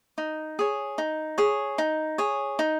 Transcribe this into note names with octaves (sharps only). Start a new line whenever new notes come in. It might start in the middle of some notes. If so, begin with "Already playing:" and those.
D#4
G#4 C#5
D#4
G#4 C#5
D#4
G#4 C#5
D#4